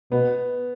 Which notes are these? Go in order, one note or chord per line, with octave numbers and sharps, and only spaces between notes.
B2 B3